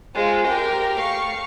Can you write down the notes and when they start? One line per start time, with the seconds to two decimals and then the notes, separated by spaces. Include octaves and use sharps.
0.15 G#3 C4 F4
0.46 G4 A#4 G5
0.99 A3 F5 C#6